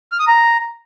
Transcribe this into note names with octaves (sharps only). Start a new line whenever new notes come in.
F6
D#6
A#5